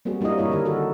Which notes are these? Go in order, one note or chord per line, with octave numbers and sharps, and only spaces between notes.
G3 A#3 C4 F#4 G#4
G3 A#3 D4 E4 A#4 D#5
G3 E4 A#4 C#5
D3 D#3 D#4 A#4
F#4 A4